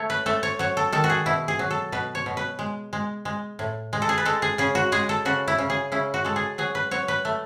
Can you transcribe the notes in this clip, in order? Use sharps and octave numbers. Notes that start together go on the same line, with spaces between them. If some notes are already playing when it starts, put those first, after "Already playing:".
Already playing: A3 C#5
B4
A3 A4
C#5
F#3 C#5
A4
D#3 A4
F#4
G#4
B2 E4
G#4
F#3
A4
B2 B4
C#5
B2
B4
G#3
G#3
G#3
A2
G#3
A4
G#4
B4
G#3 A4
G#4
C#3 G#4
F#4
G#3 G#4
A4
C#3 F#4
E4
C#3
G#4
C#3 E4
F#4
G#3 A4
G#4
F#3 G#4
B4
F#3 C#5
B4
A3